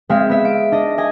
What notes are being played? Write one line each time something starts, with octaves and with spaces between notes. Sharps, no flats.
G#3 C4 G#4 E5 F5
B3 E5
D7
D4 D#5
D#5 G#5